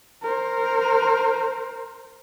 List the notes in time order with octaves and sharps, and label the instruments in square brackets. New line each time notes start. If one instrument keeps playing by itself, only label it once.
[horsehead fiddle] A#4 C5